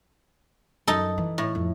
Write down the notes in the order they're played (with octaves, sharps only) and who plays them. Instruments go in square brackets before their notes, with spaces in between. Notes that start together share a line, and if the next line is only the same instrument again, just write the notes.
[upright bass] F#2 [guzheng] D#4 A4
[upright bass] E3
[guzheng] A2
[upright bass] F2